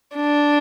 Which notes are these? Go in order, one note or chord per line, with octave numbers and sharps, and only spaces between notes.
D4